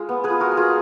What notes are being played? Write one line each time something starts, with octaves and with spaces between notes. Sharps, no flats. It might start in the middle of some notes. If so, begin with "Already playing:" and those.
Already playing: G#3 F4
B3
G#4 B4
F4
F#4 A#4
G#3
F4 G#4